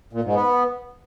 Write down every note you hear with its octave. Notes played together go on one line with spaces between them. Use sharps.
A#2
G#2
B3